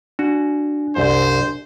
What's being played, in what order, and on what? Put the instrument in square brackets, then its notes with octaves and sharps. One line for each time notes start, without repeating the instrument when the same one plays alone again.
[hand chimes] D4 [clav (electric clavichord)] F#4
[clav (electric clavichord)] C2 F#2 [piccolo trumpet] C5